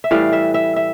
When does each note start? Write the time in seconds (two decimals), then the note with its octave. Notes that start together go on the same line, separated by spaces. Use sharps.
0.04 E5
0.11 A2 E3 G3 F5
0.33 E5
0.54 E5
0.76 E5